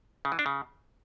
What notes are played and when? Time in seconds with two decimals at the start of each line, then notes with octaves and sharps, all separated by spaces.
0.25 C#3
0.32 E3
0.39 D4
0.46 C#3